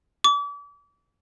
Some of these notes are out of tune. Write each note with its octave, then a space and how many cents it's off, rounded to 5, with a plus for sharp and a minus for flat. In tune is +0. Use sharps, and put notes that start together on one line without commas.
D6 -40